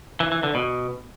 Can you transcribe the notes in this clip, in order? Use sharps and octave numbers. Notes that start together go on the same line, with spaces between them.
E3
E3
D3
B2